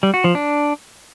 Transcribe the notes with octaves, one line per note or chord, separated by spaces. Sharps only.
G3
F#4
F3
D4